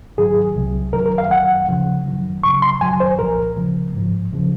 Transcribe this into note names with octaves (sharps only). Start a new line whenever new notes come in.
G#2 D#3 F#3 G#4
C2 C3 F#3
F#2 D#3 F#3 A#4
A#4
F5
F#2 D#3 F#3 F#5
D#2 C#3 F3
F#2 D#3 F#3
D#2 C#3 F#3 C#6
C6
F#2 D#3 F#3 G#5
C5
C2 A#2 F3 A#4
D#2 C#3 F3
G#2 F3
D#2 C#3 F3